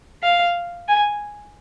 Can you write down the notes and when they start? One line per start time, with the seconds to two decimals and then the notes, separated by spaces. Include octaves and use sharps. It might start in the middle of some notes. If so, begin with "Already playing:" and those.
0.23 F5
0.88 G#5